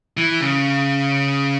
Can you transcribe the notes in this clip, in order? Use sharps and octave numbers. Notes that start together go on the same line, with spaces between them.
E3
C#3